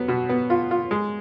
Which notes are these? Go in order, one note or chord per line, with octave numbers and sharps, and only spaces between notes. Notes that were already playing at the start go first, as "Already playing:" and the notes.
Already playing: F#3 B3
B2
B3
F4
F4
G#3